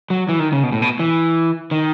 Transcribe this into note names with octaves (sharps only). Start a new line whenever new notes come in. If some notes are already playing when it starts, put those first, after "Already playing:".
F#3
E3
D#3
C#3
B2
A2
B2
E3
D#3